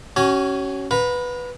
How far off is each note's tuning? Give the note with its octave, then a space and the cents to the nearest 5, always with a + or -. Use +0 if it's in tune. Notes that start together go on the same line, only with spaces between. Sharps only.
C#4 +0 F#4 +35 G#5 +0
B4 +0 F#5 -40 A#5 +0